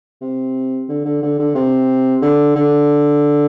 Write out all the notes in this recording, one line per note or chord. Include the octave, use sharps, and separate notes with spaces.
C3
D3
D3
D3
D3
C3
D3
D3